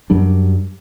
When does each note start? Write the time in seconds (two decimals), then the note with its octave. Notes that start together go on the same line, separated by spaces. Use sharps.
0.10 F#2 F#3 G3 D4